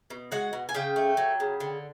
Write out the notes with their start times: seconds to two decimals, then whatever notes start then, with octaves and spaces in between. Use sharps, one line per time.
0.10 B2
0.32 G#3 F#4 F#5
0.53 B2
0.69 G#5
0.74 C#3 G4 G5
0.96 A3
1.17 F#3
1.40 C#3
1.60 D3